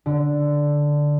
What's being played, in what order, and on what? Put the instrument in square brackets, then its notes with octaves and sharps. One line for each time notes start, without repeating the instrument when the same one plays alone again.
[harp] D3